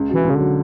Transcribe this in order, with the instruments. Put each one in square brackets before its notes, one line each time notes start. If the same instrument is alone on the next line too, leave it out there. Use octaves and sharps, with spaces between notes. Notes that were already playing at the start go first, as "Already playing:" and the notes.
Already playing: [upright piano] C#2
[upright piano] B2 [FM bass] E3
[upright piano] C#2
[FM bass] C#3
[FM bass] D3 [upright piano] F#3